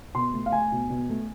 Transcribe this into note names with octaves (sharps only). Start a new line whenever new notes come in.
B2 C6
A3
F5
A3 G#5
B2
B2
A3